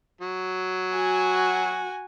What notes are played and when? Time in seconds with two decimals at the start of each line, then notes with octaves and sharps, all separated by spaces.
0.21 F#3
0.95 F#4 G#5